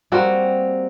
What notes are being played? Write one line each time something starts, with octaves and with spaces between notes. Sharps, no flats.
G3 A#3 C4 F#4